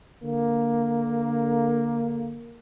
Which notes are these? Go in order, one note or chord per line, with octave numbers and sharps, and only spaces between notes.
D3 A#3